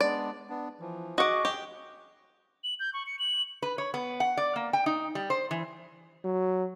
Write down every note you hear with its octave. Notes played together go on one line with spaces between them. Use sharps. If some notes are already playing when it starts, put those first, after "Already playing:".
G#3 B3 D4 D5
B3 D4
E3 F3
F#4 G#4 D#5 F#5 C#6 D6
G4
F#7
G6
C#6
C#7
F#7
B4
C#5
B3
F#5
D5
A#3
G5
D#4
G3
C5
E3
F#3